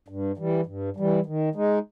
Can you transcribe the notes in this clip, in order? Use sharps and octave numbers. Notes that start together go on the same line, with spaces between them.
G2
E3 G3
G2
E3 G3
D#3
G#3 D#4